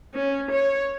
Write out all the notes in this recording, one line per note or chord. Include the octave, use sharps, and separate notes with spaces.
C#4
C#5